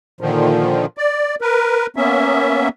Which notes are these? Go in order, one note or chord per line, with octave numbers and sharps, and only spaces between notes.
A#2 D3 D#3 F3
D5
A#4 B4
A#3 B3 C#4 E5